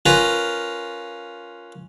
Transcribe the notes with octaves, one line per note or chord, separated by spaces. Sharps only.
C#4 F4 A#4 B4